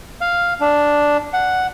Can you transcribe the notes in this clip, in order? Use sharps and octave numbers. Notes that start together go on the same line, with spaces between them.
F5
D4
F#5